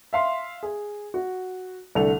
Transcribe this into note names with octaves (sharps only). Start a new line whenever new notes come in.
E5 F5 C6
G#4
F#4
C2 D3 A3 A4 F7